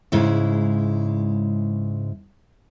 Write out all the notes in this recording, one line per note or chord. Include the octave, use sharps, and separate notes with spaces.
G#2 C#3 G#3 E4